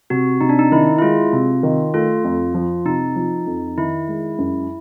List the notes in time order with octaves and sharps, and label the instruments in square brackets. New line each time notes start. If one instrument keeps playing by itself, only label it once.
[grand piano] C3 [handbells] F#4
[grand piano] C3 [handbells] D#4
[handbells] D4
D#4
[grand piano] D#3 [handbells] E4
[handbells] E4
[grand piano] G#3 [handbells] F4
[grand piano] C3
D#3
[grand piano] A3 [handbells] F4
[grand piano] F2
F3
[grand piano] C3 [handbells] D#4
[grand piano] F3
F2
[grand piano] D#3 [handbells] E4
[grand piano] G#3
F#2